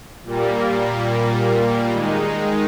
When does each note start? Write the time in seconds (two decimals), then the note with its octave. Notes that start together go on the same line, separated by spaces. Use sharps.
0.24 A#2 G3 A#3
1.90 D#3 G#3 D#4